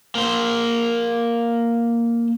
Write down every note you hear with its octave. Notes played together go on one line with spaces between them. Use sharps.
A#3 C5